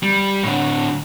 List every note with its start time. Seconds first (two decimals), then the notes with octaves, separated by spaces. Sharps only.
0.03 G3
0.43 A2 D3